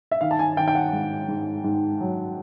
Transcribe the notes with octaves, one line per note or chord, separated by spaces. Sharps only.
E5
D#3 F5
A5
G#5
D#3 G5
G5
F#5
G#2
G#2
G#2
F#3